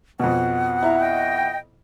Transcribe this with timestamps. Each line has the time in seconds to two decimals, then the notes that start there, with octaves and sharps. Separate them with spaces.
0.20 F2 B2 F#5
0.83 E4 A#5
1.00 D#5 G5